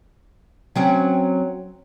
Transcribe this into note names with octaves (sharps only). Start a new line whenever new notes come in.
F#3 C4 C#4